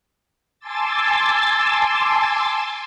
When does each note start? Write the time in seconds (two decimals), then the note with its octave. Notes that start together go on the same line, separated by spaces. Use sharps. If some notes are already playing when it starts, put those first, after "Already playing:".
0.59 G#5 A5 C6 D6 E6 A6